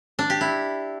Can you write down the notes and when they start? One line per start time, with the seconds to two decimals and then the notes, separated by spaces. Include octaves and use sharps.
0.19 D4
0.30 G4
0.41 E4